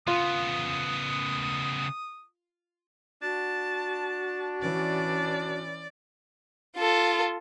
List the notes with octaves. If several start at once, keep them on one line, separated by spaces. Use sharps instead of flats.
C#3 B3 F4 D#6
D4 F#4 A5
E3 C#4 D5
F4 A4